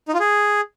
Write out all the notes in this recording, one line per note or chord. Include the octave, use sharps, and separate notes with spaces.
D#4
F4
G#4